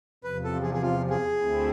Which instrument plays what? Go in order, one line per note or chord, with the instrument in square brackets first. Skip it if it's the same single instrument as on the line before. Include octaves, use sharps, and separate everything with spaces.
[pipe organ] E2 C3 F3 [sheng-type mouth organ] B4
[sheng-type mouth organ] A4
G#4
G#4
F4
G#4
[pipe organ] D2 D3 A3 C4 E4